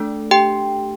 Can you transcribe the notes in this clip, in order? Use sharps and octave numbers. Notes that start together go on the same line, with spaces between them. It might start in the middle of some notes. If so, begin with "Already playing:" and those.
Already playing: A3 D4 A4
G4 G5